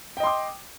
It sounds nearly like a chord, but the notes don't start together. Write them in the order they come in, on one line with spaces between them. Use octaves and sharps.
G5 D#5 C6 D6